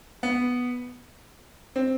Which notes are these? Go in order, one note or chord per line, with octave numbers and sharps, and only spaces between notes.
B3
C4